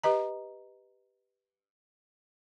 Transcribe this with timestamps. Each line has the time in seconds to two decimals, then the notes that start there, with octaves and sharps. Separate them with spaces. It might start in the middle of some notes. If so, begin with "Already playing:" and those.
0.04 G4 B4 D#5 A#5